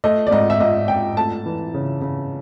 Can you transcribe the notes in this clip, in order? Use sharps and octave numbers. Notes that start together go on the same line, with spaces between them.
A3 D#5
D5
G#2 D#5
E5
G#2 D#5
G#2 G5
A3 A5
E3
C#3
C#3